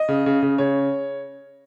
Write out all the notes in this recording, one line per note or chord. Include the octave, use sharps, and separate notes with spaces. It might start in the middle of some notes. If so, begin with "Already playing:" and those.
Already playing: D#5
C#3
C#3
C#3
C#3 C#5